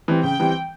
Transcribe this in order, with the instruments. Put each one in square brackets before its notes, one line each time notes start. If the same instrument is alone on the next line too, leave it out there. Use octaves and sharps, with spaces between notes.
[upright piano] E3 G3 C4
[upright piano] C#3 [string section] G5
[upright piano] E3 G3 C4